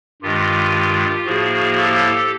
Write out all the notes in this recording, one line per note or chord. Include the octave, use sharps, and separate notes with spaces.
G2 D#3 G#3 F4 G4
A2 F3 A#3 F#4 G#4
G4 A4